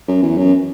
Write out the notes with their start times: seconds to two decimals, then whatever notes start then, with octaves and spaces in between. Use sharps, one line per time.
0.08 F#2
0.22 E2
0.37 F#2